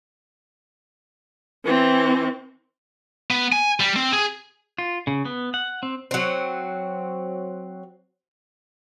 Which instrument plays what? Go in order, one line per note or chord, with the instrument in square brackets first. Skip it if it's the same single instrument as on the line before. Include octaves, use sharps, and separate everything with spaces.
[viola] E3 C4
[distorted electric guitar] B3
G#5
G3
C4
G#4
[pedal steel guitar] F4
C#3
B3
F#5
C4
[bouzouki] F#3 C4